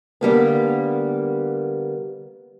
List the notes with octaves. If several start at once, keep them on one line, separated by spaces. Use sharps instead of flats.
D3 G3 A#3 B3